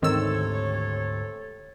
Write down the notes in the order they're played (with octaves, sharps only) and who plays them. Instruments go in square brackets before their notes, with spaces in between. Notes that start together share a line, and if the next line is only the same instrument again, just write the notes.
[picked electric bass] D2 G#2 C4 [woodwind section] C3 A4 C#5 [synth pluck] D#3 E6